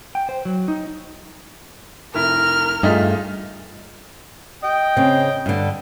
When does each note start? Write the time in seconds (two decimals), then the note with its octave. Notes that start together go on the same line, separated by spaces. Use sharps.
0.15 G5
0.29 C5
0.45 F#3
0.68 D#4
2.15 F1 E4 A#4 F6
2.83 G2 A3 D#4 F4 G#4
4.64 D#5 G5
4.97 C#3 C4
5.46 G2 D3